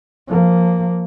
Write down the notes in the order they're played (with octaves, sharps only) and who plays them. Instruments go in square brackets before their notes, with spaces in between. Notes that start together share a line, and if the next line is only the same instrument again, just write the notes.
[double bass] F3 A#3